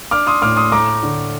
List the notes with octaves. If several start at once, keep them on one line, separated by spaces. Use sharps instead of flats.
D4 D6 F6
C6 D#6
A2 D6 F6
C6 D#6
A3 A#5 D6
D3